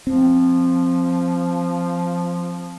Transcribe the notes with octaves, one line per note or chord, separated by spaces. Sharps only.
F3 C4